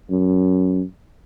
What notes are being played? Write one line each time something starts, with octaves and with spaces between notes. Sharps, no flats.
F#2